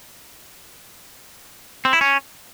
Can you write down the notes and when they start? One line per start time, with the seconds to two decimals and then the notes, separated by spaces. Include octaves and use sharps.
1.85 C4
1.93 E4
2.01 C#4